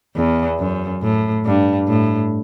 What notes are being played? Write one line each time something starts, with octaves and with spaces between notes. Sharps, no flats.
E2
F#2
A2
G2
A2